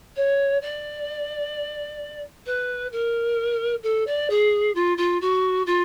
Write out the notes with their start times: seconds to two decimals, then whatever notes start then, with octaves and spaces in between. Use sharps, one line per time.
0.16 C#5
0.62 D5
2.46 B4
2.92 A#4
3.83 A4
4.07 D5
4.30 G#4
4.75 F4
4.97 F4
5.21 F#4
5.66 F4